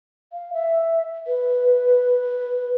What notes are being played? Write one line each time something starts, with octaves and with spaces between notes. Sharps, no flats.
F5
E5
B4